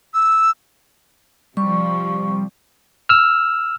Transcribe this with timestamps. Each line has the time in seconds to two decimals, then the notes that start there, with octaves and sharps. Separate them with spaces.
0.14 E6
1.57 C3 F3 G3 C#6
3.09 E6 F6